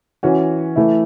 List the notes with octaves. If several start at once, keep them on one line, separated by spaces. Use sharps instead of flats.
E3 C#4 F#4
E3 A3 E4